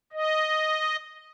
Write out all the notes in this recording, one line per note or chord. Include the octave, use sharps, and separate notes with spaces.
D#5